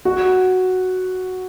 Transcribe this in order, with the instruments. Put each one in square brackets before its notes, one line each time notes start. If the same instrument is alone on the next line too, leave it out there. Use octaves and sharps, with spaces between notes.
[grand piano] F#4